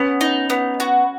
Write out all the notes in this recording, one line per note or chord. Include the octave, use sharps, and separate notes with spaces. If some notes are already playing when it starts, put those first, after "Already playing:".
Already playing: B3 C#4
D#4
B3
F#4